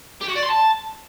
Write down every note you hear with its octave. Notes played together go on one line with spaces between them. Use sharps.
G4
F#4
D5
C6
A5